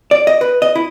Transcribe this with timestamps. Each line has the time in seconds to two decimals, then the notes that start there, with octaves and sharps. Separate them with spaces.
0.11 D5
0.27 D#5
0.41 B4
0.62 D#5
0.75 E4